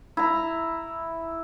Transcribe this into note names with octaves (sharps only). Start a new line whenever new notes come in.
E4 A#5